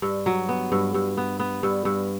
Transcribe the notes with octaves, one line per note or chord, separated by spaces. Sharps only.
G2
F#3
B3
G2
G2
B3
B3
G2
G2